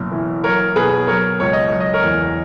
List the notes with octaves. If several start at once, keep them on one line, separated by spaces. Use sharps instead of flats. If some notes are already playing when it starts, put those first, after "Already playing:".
Already playing: F#1 B2
E3
F#3 A#4 C#5
B2 G#4 B4
F#3 A#4 C#5
C#2 C#5
D#5
F#3 C#5
D#5
A#4 C#5
E2